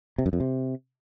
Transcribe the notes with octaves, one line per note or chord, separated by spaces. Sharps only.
C3
F#2
F2
C3